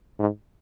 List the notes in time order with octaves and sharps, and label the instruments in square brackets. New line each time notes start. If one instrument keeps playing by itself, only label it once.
[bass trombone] G#2